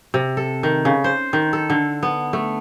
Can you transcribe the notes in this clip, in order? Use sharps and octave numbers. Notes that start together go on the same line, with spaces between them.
C3
A4
D#3
C#3
C5
D#3
A4
D3
B3
A3